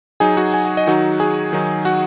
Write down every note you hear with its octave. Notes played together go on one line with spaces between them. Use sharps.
F#3 D#4 G#4 G#5
F#4 F#5
G#5
F#5
D#5
D#3 F#3 D#4 F#4 F#5
G#4 G#5
D#3 F#3 D#4
F#4 F#5